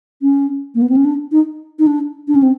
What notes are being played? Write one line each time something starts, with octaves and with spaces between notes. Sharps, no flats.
C#4
A#3
B3
C4
C#4
D4
D#4
D#4
D4
D4
C#4
C4